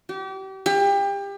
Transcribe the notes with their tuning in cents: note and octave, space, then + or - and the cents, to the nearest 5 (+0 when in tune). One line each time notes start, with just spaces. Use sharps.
G4 -35
G4 +30